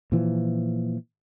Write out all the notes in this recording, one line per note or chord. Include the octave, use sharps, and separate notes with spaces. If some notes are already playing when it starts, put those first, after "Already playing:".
A#2 E3 F3